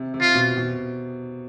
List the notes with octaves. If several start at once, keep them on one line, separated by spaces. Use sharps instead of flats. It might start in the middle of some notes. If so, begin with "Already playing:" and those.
Already playing: C3
C3
F4
B2
B2